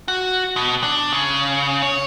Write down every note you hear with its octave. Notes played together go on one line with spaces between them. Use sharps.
F#4
B2
D4
C#3
C#5